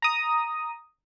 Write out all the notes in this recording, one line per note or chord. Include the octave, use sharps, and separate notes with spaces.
A#5 D#6